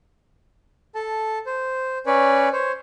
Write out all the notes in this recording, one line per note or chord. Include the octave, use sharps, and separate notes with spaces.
A4 A5
C5
C#4 B4 C#5 D5
C5 C#5